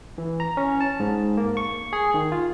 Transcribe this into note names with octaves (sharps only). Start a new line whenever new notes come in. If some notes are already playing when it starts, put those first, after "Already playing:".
E3
A#5
C#4
A5
G#2
A#3
C#6
G#4
D#3
F4